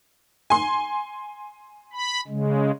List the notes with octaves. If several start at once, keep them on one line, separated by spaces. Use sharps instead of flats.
G#5 C6
B5
C#3 G#3